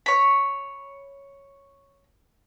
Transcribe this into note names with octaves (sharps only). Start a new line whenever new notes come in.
C#5 B5